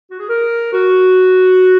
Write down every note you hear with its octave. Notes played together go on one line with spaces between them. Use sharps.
F#4
G#4
A#4
F#4